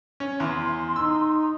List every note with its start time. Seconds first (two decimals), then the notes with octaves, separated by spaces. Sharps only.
0.20 C#4
0.40 E2 C6
0.96 D#4 E6